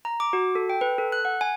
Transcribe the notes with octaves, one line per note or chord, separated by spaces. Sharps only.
A#5
D6
F#4
A4
G5
B4
A4
F#6
F#5
G#5